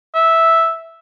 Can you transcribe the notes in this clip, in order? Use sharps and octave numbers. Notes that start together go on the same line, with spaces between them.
E5